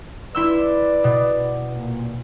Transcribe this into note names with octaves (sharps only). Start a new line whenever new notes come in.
E4 B4 D5 C6 E6
B2
A#2